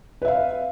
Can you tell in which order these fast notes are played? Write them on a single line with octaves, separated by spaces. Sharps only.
B4 E5 F5